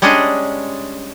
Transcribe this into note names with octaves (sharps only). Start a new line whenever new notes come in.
G3 G#3 C#4 D4 G#4 D#5